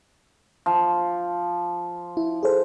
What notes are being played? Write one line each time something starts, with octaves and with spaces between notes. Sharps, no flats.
F3
E4
G#4 A4 C5